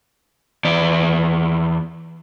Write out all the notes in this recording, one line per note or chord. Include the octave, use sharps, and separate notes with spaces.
E2 D5